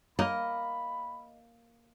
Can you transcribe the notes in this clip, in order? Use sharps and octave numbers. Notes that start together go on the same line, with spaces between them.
A#3 A#4 D#5 B5